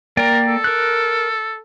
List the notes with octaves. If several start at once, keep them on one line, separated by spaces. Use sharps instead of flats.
A#3 A#4 D5 G5
A4
A#4 F#6